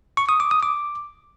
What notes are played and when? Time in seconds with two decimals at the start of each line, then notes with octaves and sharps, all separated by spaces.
0.17 C#6
0.29 D#6
0.40 D6
0.51 D#6
0.63 D6